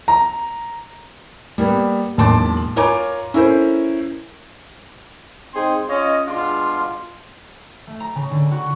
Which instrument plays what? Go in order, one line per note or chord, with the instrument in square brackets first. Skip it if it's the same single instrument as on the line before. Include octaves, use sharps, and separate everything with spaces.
[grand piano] A#5
[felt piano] G3 A#3 B3
E1 B1 A#3 A5 C6 D6
F4 A#4 C#5 G#5 A#5 D6
C#4 E4 A4 A#4 C5
[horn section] G#2 C4 D#4 G#4 G5 C6
C#4 F4 C#5 D#5
B2 G#3 D4 F4
[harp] A3
A#5
C#3
D3
F#4